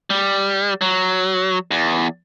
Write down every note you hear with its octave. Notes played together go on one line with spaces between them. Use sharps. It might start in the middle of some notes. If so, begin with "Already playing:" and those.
G3
F#3
E2